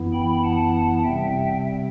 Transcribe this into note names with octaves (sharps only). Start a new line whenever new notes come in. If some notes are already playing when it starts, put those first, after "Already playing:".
Already playing: F#2 E3 B3 E4
G5 B5
F#5 A5
C3 G3 C4 E5 G5